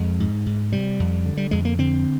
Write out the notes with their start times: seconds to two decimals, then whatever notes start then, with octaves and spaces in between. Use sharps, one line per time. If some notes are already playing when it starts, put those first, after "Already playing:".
Already playing: F2 G#3
0.20 G#2
0.46 G#2
0.72 C3 G3
1.00 F2
1.26 D3
1.37 G3
1.51 F2 G#3
1.65 A#3
1.78 D3 C4